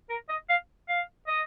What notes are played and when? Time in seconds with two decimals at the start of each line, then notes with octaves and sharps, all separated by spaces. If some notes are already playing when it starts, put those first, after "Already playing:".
0.10 A#4
0.29 D#5
0.49 F5
0.89 F5
1.28 D#5